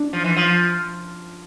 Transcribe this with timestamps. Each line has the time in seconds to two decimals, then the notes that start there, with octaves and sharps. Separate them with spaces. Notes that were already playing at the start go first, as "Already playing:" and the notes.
Already playing: D4
0.13 F3
0.24 E3
0.37 F3